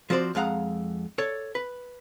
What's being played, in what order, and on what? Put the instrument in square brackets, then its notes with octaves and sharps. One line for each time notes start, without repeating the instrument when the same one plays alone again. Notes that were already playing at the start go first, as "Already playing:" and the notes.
[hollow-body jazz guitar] F3 C4 F#4 C5 D5
F2 G#3 F5 F#5 A#5
A4 C#5 D5
B4